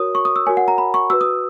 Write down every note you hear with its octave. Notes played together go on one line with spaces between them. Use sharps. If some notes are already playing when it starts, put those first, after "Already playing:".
Already playing: F#4 A#4 C#5 D#6
C#6
D#6
E6
F#4 A#4 C#5 G#5
F#5
A#5
B5
C#6
F#4 B4 E6
D#6